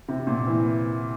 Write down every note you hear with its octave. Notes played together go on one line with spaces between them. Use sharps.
C3
A#2
E3